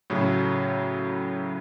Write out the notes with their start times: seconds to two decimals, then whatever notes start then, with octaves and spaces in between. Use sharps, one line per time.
0.10 A2 C#3 F#3